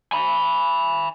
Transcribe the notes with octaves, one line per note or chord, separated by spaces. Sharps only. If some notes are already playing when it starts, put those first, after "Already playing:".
G#5 B5